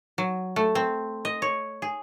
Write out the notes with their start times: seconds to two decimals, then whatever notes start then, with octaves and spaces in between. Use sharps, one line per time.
0.18 F#3
0.56 A3
0.75 C4
1.25 D#5
1.42 C#5
1.82 G#4